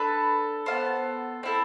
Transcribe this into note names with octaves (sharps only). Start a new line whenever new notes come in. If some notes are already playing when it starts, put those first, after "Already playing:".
Already playing: D4 A4 B4
B3 F4 A4 C5
C4 E4 A4